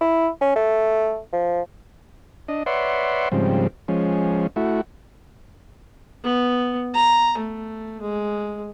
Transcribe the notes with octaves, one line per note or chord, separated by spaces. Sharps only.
E4
C#4
A3
F3
D4 D#5
B4 C#5 D5 E5 F#5 C6
G#2 C#3 F3 G3 C4
F3 G#3 C#4
A3 E4 F#4
B3
A#5
A3
G#3